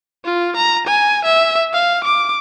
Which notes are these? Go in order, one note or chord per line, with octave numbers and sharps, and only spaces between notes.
F4
A#5
G#5
E5
F5
D6